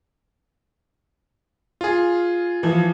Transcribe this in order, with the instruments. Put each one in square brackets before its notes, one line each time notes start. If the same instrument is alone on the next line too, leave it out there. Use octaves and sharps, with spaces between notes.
[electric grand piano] F4 G#4
[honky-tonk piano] E3 F3